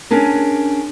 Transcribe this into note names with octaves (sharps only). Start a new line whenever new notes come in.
C#4 D4 G#4 A#4